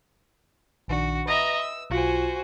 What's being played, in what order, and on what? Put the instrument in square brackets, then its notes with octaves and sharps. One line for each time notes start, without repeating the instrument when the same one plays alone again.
[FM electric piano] A#1 D#3 D4 [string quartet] F#4
[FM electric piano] B4 [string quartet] D#5 E5 A#5
[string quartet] E6
[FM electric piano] B1 F4 C#7 [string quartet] F#4 C5 G#5